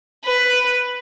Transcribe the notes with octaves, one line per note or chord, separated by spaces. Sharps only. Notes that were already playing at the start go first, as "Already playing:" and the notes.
B4